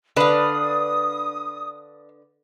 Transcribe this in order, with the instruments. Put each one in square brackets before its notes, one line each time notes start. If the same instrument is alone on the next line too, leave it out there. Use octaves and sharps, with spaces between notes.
[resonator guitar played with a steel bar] D3 B4 [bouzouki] D4 F5 [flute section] D#6